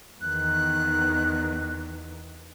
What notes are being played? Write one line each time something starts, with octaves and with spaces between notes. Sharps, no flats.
E2 D#3 F#6